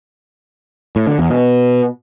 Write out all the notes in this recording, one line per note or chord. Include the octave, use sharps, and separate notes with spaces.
A2
D3
E2
B2